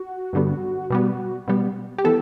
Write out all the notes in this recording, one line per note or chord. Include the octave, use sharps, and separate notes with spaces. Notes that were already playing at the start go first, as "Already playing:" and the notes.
Already playing: F#4
G2 D3 G3 B3
B2 G3 B3
B2 G3 B3
G4
E3 B3 A4